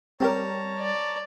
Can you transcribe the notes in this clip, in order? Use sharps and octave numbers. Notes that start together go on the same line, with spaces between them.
G3 C4 C#4 G4 A#4 C#5 A5 A#5
D5